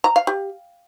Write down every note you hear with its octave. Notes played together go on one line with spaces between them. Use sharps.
A#5
F5
G4